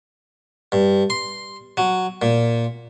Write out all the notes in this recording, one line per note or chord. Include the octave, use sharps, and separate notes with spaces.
G2
C6
F#3
A#2